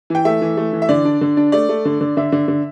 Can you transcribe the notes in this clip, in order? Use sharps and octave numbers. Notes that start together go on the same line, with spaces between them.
E3 G5
A3 E5
E3
A3
E3
E5
D3 D5
D4
D3
D4
A3 D5
A3
D3
D3
D3 E5
D3
D3